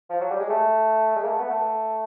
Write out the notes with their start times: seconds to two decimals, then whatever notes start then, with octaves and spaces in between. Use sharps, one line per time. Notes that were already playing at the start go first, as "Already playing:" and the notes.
0.10 F3
0.21 F#3
0.31 G3
0.40 G#3
0.49 A3
1.16 G#3
1.23 A#3
1.27 A3
1.39 B3
1.50 A3